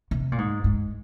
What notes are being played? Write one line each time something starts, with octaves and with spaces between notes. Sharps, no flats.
C3
A#2
G#2
G#2